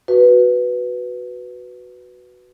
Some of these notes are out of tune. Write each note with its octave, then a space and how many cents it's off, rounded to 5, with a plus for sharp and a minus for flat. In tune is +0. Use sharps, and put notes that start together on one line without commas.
F#4 +0 B4 +0